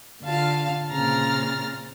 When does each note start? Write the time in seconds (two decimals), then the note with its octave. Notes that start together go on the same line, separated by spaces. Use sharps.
0.22 D3 F4 F5 A5
0.90 A#2 C#3 C4 A#5 F6 A6